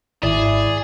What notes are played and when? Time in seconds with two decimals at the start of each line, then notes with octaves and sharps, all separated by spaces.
0.23 G#1 E4 G#4 D5